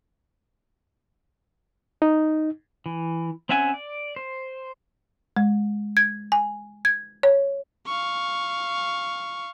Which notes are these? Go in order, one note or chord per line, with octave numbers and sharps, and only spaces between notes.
D#4
E3
C4 C#4 E5 F#5 G#5
D5
C5
G#3
G#6
G#5
G#6
C#5
F5 C#6